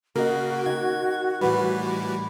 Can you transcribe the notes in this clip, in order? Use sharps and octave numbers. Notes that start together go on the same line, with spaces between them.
C#3 A#3 F#4 A#4 D#5
D#3 G#6
A2 E3 G3 B4